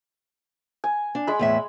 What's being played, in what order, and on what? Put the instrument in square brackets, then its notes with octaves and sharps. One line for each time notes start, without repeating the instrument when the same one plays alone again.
[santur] G#5
[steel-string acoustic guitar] D4
[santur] G#3 B5
[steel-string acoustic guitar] E2 A2 E5